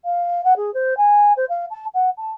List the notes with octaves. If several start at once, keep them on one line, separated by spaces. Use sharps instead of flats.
F5
F#5
G#4
C5
G#5
C5
F5
A5
F#5
A5